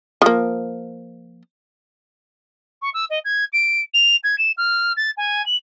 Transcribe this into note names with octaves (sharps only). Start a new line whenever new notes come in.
F3 A#3
C#6
E6
D#5
G#6
D7
F7
G#6
E7
F6
A6
G#5
F#7